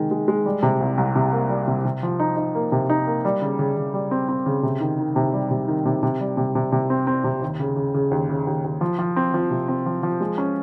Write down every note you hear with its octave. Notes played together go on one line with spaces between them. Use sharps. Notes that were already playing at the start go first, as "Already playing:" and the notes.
Already playing: C3 D#3 G#3
G#3
G#3
G3
C3
C2
C2
C3
A#3
G3
C3
C3
F3
D#4
D#4
A#3
C3
D#4
A#3
G3
C#3
C#3
C#3
G3
C4
C4
C#3
C3
D#3
D#3
C3
G3
C3
D#3
C3
C3
G3
C3
C3
C3
C4
C4
C3
D#2
C#3
C#3
C#3
D#2
C#3
D#2
D#2
F3
F3
C4
F3
C3
C4
F3
F3
G#3
C#4